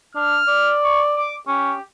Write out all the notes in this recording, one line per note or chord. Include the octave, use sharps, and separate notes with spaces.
D4 F6
D5
C#6
D6
C#4 G4